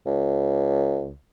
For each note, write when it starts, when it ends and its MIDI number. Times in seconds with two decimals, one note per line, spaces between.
0.06 1.13 37